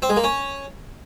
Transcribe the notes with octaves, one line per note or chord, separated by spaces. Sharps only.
C4
G#3
A#3
C#4